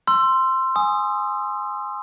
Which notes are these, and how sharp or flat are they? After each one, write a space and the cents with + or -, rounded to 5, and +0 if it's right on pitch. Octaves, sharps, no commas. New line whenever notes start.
C6 +0 E6 +25
G#5 +0 D#6 +0